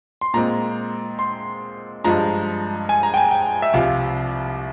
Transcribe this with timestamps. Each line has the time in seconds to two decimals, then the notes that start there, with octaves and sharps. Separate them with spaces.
0.21 C6
0.34 A#2 G#3 C4 A#5
1.19 C6
2.04 G2 F3 G#3 A#5
2.89 G#5
3.03 A#5
3.14 G5
3.17 G#5
3.31 G5
3.62 E5
3.74 C2 C3 F3 F5